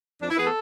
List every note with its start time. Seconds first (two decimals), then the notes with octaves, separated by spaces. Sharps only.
0.22 F2 D4
0.30 E4
0.37 E3 B3 G#4 B4
0.46 A4